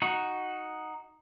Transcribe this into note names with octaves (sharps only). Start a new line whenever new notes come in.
D#4 F#4